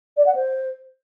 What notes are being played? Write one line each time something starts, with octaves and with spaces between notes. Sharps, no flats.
D5
F#5
C5